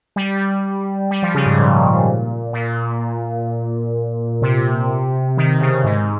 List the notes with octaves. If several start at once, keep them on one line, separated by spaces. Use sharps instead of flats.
G3
G3
F3
C#3
G#2
A#2
A#2
C3
D#3
C#3
G#2